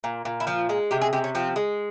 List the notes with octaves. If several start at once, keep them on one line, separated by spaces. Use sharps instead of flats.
A#2
A#2
E4
F3 F4
G#3
C3 G4
G#4
C3 G4
C#4
F3 C4
G#3